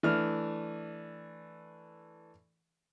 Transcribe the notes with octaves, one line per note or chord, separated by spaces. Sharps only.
E3 A3 D4 F6